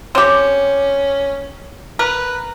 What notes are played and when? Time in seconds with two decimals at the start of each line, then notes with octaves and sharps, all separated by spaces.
0.15 C4 C#4 G4
1.99 A#4 B4